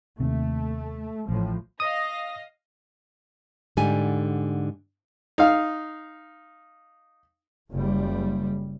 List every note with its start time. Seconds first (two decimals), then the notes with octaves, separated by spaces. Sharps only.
0.20 D#2 C3 A3
1.29 A1 A2 F3
1.80 D#5 F5 D#6 A#6
3.77 G#2 D3 G3 G#5
5.38 D#4 F5
7.72 F#1 G3